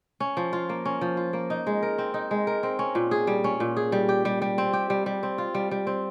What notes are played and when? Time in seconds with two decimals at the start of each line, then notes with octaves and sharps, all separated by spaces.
0.20 C#4
0.37 F3
0.53 F4
0.69 A#3
0.85 C#4
1.01 F3
1.17 F4
1.33 A#3
1.50 D#4
1.67 G#3
1.83 A#4
1.98 C4
2.14 D#4
2.31 G#3
2.47 A#4
2.63 C4
2.79 C#4
2.95 A#2
3.11 G#4
3.27 G3
3.44 C#4
3.60 A#2
3.77 G#4
3.92 G3
4.09 G4
4.25 G3
4.42 G3
4.58 C4
4.73 G4
4.90 G3
5.06 G3
5.23 C4
5.38 F4
5.55 G3
5.71 G3
5.87 C4